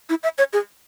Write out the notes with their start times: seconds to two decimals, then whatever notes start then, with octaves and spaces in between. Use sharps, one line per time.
0.10 E4
0.23 E5
0.38 C#5
0.53 G#4